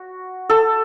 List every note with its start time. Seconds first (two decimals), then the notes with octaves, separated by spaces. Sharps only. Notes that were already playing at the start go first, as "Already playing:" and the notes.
Already playing: F#4
0.49 A4